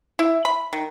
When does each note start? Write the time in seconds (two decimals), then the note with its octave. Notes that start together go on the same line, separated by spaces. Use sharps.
0.19 E4
0.45 B5
0.73 D#3